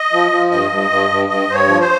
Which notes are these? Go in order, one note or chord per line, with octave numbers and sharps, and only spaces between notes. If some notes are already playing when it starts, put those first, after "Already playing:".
Already playing: D#5
F3
F3
G2 D#5
G2
G2
G2
G2 D#5
G2 C5
C#5
F3
C5